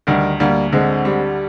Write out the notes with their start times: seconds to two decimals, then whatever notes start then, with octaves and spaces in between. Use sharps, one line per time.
0.07 D2 D#3 G3
0.40 D2 G3 A#3
0.72 D3 G#3 C4
1.05 G3